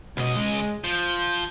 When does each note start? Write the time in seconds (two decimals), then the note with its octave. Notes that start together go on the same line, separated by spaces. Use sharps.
0.17 C#2 B2 D#5
0.37 G#3
0.84 F3 G6